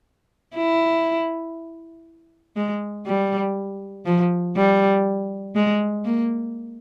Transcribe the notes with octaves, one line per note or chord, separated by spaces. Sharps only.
E4
G#3
G3
F3
G3
G#3
A#3